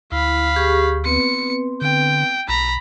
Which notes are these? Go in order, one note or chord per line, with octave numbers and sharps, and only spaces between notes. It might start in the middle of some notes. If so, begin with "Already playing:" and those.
D2 E4 F5 B5
G4 G#4 C#6
B3 C4 B4 C#7
D3 G5
B1 A#5 B5